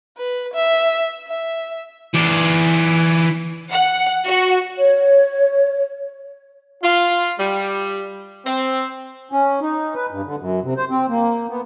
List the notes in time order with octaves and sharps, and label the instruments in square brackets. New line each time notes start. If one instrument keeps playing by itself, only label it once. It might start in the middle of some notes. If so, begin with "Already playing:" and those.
[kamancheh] B4
E5
E5
[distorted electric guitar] E3 D5
[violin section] F#5
F#4
[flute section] C#5
[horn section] F4
G3
C4
[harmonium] C#4
D#4
B4
G2
D3
F#2
C3
C5
C4
A#3
B3